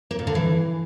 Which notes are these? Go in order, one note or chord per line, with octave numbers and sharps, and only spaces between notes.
A#3
A#2
D3
E3